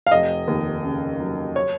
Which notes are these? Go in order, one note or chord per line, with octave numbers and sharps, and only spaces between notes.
F5
F1 D#5
D#2
C#3
F#3
C#5